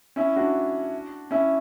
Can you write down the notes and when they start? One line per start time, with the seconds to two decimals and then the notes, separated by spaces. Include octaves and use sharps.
0.16 C#4 E4
0.36 D4 F#4
1.31 C#4 E4